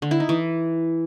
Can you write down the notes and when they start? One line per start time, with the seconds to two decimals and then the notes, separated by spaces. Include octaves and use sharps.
0.02 D3
0.11 E4
0.20 D#4
0.29 E3